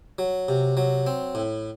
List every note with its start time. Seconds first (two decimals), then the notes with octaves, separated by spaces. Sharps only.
0.19 F#3
0.48 C3
0.77 F#3
1.07 C4
1.35 A2